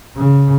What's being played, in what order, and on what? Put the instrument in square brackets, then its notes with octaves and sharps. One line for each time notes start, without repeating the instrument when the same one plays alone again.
[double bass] C#3